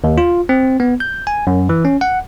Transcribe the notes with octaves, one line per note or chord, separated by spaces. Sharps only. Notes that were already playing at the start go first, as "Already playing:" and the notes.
D#2
F4
C4
B3
G6
G#5
F#2
E3
C#4
F#5